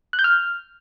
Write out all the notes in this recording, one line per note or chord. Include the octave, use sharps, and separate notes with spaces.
F#6
G6
F6